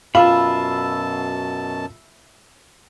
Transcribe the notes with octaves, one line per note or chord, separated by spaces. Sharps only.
F#2 B2 F4 E5 A5 B5